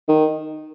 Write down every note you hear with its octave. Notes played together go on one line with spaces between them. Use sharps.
D#3